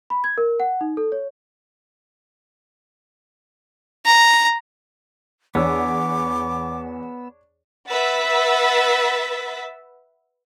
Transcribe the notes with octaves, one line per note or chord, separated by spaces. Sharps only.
B5
G#6
A#4
F#5
D#4
A4
C#5
A#5
E2 B3 D4 C#5 D6 E6
B4 E5 F#5 E6 A6 B6